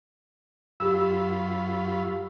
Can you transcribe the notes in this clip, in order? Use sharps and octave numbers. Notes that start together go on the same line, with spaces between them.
F#2 F4 G4 B5 E6